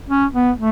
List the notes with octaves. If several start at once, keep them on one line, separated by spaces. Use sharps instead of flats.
C#4
B3
A3